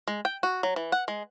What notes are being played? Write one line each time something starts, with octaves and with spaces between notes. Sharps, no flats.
G#3
G5
F#4
F#3
E3
F#5
G#3